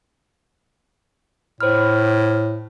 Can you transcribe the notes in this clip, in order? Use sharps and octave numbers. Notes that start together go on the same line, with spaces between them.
A2 C5 B5 F6